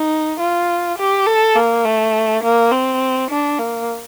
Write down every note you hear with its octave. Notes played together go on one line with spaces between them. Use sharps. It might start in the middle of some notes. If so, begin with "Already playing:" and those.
Already playing: D#4
F4
G4
A4
A#3
A3
A#3
C4
D4
A#3